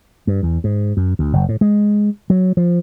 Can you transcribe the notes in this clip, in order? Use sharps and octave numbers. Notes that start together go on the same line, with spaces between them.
G2
E2
G#2
F#2
D2
F#1
A2
G#3
F#3
F3